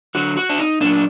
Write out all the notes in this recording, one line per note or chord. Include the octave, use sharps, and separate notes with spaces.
D3 F#3 F#4
F#4
D4
D#4
A#2 F#3 D4